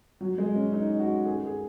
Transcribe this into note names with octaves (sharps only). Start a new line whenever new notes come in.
F#3
G#3
C#4
D#4
F#4
G#4
G#4